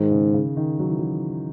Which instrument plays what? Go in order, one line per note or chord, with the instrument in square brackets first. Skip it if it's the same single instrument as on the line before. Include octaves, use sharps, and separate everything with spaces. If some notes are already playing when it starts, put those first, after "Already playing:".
Already playing: [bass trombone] G#2 [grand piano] D#3
[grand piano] C#3
C#3
D#3
F#3
E3
F#3